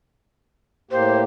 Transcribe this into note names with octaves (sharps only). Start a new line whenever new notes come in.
A2 A#3 G4 C5